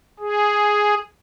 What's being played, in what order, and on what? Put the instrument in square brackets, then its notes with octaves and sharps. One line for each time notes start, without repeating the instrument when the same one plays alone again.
[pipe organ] G#4